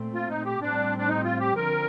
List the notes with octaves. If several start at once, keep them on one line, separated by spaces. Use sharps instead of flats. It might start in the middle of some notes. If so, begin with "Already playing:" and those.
Already playing: A#2 A3 C4
F4
D#4
G4
A2 G3 C4 D4
D4
D#4
F4
G4
D3 F3 C4 A#4